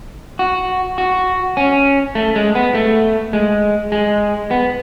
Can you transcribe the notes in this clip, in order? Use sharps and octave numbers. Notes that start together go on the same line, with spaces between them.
F#4
F#4
C#4
A3
G#3
B3
A3
G#3
G#3
B3